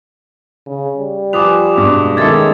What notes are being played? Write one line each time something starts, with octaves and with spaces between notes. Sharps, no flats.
C#3
G3
F3 F4 B4 G#5 D6 D#6 F#6 F7
G2 B2 G#3
D#3 G#3 A#3 C#4 A4 E5 G#6 A6